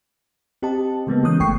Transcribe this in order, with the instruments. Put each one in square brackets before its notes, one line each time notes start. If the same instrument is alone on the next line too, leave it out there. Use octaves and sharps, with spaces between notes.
[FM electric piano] C4 G4 D#5 A5
C#3 G#3 A#3 B3
E3 G#3 C#4 D#6 F#6 G6
G1 A3 G5 C#6 C7